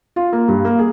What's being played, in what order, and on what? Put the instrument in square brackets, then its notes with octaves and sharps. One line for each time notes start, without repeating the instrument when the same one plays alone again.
[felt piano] F4
A#3
G2
A#3
G#4